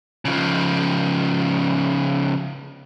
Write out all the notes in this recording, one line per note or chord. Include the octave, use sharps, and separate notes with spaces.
C#3 F3